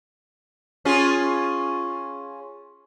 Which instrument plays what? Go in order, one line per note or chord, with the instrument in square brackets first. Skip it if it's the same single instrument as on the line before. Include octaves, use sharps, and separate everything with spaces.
[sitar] C#4 F4 G#4